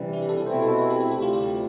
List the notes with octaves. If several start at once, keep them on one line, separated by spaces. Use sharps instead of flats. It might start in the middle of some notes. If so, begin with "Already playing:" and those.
Already playing: C3 E3 G3 D4
E4
G4
A4
B4
B2 A3 C4 E4 C5
A4
B4
G4
A4
D2 C3 G3 G4
F4
G4